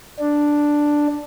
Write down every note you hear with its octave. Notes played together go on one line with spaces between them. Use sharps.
D4